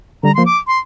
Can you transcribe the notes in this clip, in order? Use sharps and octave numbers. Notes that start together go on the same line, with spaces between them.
D3 G3 A#5
F3 A#3 C6
D6
C6